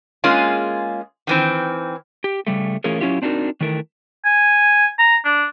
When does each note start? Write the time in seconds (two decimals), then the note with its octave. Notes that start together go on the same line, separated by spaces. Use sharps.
0.24 G#3 A#3 C#4 F4 G#4
1.27 D#3 E3 C4
2.24 G4
2.47 C#3 G3 A3
2.84 E3 A3 C#4 F4 G#4 A#4
3.00 F#3 C#4 E4 F4 G4
3.22 C4 D4 D#4 F#4 A#4
3.61 D#3 E3 A3 A#4
4.25 G#5
4.99 A#5
5.25 D4